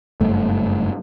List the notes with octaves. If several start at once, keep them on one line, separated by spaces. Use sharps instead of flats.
F#1 G2 A3